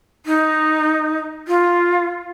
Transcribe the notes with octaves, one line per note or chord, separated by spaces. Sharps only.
D#4
F4